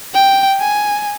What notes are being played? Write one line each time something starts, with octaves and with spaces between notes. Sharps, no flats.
G5
G#5